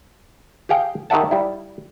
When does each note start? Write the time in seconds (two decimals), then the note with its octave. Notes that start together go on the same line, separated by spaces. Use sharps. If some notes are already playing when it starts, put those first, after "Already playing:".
0.69 G4 G#4 F5 G5
1.10 D#3 G4 E5 F#5 A5
1.31 G3 E4